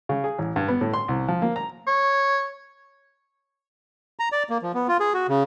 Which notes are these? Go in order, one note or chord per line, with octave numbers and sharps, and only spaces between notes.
C#3
G#4
A1
G2
B3
A2
C6
C2
F3
A#3
A#5
C#5
A#5
D5
A#3
F3
B3
F4
G#4
F#4
C#3